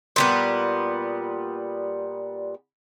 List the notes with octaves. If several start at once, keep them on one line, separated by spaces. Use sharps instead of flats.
A#2 G3 B3